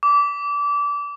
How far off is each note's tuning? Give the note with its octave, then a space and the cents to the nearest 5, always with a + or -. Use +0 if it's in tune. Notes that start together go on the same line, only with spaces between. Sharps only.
D6 -25